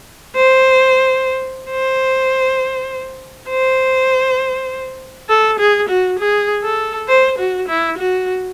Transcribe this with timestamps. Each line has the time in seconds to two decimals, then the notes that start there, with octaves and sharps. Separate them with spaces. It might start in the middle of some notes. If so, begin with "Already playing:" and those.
0.35 C5
1.70 C5
3.50 C5
5.29 A4
5.59 G#4
5.89 F#4
6.19 G#4
6.64 A4
7.08 C5
7.38 F#4
7.68 E4
7.98 F#4